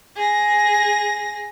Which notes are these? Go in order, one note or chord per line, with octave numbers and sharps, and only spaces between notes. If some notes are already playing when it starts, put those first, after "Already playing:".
G#4 A#6